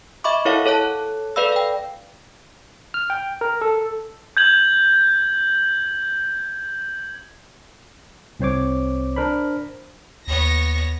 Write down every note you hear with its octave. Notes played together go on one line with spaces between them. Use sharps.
D#5 E5 B5 C#6 D6
E4 A4 A#4 C#5 F5 F#5
A4 C#5 A5 F#6
A4 B4 D5 F5 B5 E6
F5 G5
F6
G5
A#4
A4
G6 G#6 F#7
C2 C4 C5 C#5 D6
D4 A#4 C5 B5
D#2 B3 C#5 A#6